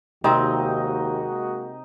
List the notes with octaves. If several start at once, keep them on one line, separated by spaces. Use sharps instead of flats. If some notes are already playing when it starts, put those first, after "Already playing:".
D#2 C3 G#3 A#3 C4 D#4 F#4